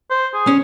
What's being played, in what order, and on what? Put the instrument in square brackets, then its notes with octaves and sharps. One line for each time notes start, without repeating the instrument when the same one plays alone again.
[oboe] C5
G#4
[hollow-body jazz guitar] C#4